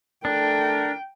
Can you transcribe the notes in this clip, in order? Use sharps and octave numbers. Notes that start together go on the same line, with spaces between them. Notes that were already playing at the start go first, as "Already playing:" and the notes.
A3 D4 A4 A#4 G5